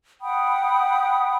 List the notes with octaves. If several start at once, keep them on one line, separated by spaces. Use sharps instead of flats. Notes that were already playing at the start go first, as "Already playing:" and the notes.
F#5 G5 B5 D#6